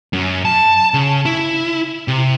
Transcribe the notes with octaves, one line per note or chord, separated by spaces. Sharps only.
F#2
A5
C#3
E4
C3